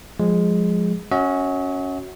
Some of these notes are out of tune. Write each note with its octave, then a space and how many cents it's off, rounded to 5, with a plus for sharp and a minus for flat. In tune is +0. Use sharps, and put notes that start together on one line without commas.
F3 +25 G#3 +0
C#4 +0 F#4 +0 E5 -45